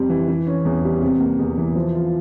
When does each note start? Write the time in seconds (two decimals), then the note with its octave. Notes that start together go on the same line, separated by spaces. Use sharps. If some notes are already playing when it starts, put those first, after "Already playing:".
Already playing: F2 C3 G3
0.10 E3
0.28 E3
0.47 C#4
0.65 E2
0.84 G3
1.02 C3
1.20 A#3
1.39 E2
1.58 E3
1.75 F3
1.95 F4